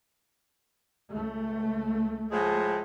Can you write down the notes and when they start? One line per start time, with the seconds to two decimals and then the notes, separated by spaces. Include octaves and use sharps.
1.11 C#2 A3
2.31 A2 F3 G#3